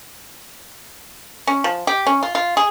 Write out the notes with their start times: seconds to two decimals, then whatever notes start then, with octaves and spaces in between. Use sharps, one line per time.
1.47 C#4
1.64 F3
1.87 G4
2.07 C#4
2.23 F4
2.35 F4
2.57 G#4